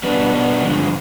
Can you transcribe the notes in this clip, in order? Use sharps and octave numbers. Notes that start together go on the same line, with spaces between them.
B2 G3 B3 D4
B2 G3 B3 D4
G2 D3 F3 G#3